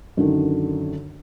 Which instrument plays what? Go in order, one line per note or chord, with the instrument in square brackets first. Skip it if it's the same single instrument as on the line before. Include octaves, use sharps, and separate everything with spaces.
[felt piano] F#2 D3 D#3